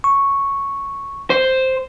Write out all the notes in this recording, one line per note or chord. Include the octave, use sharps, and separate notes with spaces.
C#6
C5